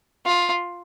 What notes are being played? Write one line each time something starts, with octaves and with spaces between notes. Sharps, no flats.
F4